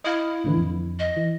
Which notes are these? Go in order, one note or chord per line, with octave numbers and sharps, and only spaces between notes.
E4 D#5 F5
A2 D3 E3
F2
D#5
E3